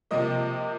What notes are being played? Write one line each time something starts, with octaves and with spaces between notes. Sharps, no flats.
C3 F3 A#3 D#5